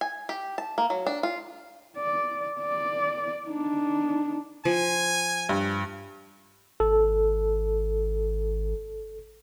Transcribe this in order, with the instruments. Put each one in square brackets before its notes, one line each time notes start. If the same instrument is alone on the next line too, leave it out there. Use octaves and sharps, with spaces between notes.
[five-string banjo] G#5
G4
A5
A#3
F#3
D4
F4
[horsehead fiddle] D5
D5
D4 D#4
[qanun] F3 [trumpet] G#5
[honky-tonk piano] G2
[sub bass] G#1 [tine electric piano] A4